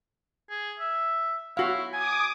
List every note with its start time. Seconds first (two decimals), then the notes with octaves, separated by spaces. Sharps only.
0.50 G#4
0.80 E5
1.57 E4 F#4 F5
1.93 G#5 D6 D#6